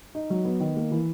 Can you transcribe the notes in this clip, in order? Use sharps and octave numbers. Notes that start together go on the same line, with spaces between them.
D#4
F#3
B3
D#3
A#3
E3